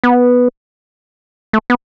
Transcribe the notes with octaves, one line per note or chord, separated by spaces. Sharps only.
B3
A3
B3